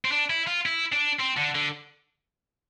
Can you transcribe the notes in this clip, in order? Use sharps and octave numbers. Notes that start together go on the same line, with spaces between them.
C4
D4
E4
F4
E4
D4
C4
D3
D3